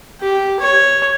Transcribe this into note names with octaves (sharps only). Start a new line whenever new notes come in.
G4
C#5